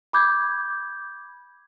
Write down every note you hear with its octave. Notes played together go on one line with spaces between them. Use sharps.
B5 D6 G6 G#6